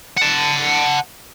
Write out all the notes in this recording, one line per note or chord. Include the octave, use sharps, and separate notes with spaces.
F#5 A5